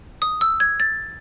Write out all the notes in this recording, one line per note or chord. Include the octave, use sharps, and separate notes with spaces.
D#6
E6
G#6
A6